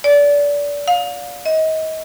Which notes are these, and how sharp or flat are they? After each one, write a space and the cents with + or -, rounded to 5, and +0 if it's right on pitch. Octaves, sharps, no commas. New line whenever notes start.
D5 -25
F5 +30
D#5 +30